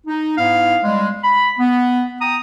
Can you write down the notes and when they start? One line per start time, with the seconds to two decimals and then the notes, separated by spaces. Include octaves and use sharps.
0.07 D#4
0.37 G#2 B3 E4 F5
0.84 G3 G#3
1.22 B5
1.58 B3
2.20 G5 A#5 D#6